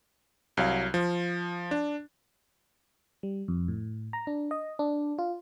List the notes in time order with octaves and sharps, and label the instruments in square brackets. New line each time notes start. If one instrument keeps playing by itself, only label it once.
[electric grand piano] C2 F#3 F5
F3
D4
[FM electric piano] G3
F2
A2
A#5
D4
D#5
D4
F4